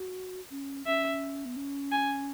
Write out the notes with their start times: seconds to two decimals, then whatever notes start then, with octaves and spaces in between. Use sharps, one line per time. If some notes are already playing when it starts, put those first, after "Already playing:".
Already playing: F#4
0.51 C#4
0.86 C#4 E5
1.45 B3
1.56 C#4
1.91 G#5